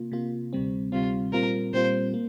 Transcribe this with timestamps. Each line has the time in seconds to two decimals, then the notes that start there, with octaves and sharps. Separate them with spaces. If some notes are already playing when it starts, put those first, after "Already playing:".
Already playing: C3 A#3 F4
0.12 C3 A#3 F4
0.53 D2 C3 G3 C4
0.92 D2 C3 G3 C4 F4
1.32 A#2 G3 C4 F4 A#4
1.73 A#2 G3 C4 F4 C5
2.14 A#3